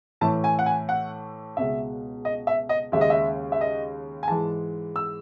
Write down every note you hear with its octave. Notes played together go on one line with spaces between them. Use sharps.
A2 E3 A3 A5
G#5
F#5
G#5
F#5
C#2 B2 G#3 E5
D#5
E5
D#5
D#2 C#3 G#3 E5
D#5
E5
E5
D#5
G#5
G#2 E3 G#3 A5
E6